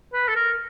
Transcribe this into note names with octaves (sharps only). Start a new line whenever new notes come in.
B4
A4
A#4